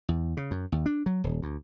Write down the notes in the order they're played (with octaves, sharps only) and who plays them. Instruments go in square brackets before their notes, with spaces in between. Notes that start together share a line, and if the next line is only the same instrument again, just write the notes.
[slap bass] E2
C#3
F#2
D#2
D4
F#3
D#1
D2